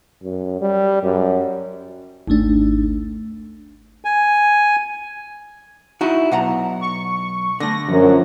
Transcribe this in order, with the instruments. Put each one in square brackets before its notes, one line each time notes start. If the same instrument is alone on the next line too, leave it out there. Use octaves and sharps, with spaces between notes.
[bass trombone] F#2
G3
F#2
[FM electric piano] G#1 D2 A3 D4
[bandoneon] G#5
[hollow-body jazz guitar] D#4 E4 F#4
B1 F#5 A#5
[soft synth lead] C#6
[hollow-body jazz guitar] D3 A3 [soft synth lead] A#6
[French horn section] F#2 [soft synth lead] F3